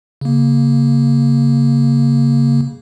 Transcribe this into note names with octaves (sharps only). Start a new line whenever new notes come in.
C#3 A#3